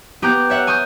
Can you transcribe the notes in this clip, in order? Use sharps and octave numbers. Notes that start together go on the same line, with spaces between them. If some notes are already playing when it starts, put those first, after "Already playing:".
B3 G4 G5 A#5 G6
C#5 E5 F#5
G#5 C#6 D#6 G6